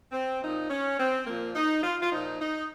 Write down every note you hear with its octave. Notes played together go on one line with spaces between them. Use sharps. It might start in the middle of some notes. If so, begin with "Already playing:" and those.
C4
A#2 F3 D#4
C#4
C4
A#2 F3 A#3
D#4
F4
F4
A#2 F3 D#4
D#4